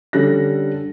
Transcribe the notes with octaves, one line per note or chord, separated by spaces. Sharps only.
D3 G3 C#4 A4 F#6 A#6